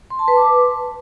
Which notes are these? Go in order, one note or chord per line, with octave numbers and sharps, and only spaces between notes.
C6
A5
B4
D6